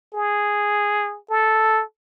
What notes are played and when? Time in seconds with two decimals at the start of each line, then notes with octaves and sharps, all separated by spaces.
0.14 G#4
1.30 A4